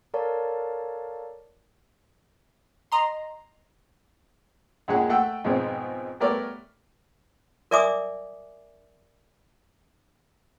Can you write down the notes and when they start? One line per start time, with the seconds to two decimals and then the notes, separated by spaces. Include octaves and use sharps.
0.14 A4 A#4 C#5 D5 F5 A5
2.92 D#5 A#5 C6
4.88 D#2 A#2 G#3 C#4 G#4 F#5
5.09 A3 F#5 G5 E6
5.44 F2 G#2 B2 G#3 B3 C4
6.20 G3 A3 B3 A#4 C#5 D5
7.71 A#4 D5 E5 G#5 D6 D#6